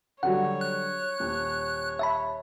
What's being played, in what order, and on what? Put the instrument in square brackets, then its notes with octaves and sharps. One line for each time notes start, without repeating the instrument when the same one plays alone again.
[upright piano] D3 F#3 G3 [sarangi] C#5 [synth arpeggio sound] F#5
[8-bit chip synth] F#6
[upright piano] D#1
[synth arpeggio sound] E5 A5 B5